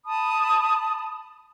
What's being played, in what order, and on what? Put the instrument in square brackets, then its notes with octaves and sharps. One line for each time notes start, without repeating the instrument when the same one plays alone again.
[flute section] A5 B5 D#6